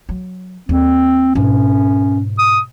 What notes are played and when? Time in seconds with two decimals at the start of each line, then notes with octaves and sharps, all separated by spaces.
0.09 F#3
0.69 D#2 C4
1.35 G#2 B2 C#4
2.39 D#6